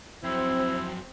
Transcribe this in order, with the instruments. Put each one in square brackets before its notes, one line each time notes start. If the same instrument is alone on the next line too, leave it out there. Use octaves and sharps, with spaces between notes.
[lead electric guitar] F2 F#3 [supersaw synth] C4 [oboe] E4 [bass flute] C5